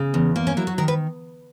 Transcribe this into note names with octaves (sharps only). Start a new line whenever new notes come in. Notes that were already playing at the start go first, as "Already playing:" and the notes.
Already playing: C#3
E2
A#3
C#4
F#3 E4
F#4
D#3 A#4
B4